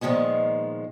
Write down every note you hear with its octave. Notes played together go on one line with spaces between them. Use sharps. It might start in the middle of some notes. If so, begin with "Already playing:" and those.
A#2 D#3 F3 G#3 B3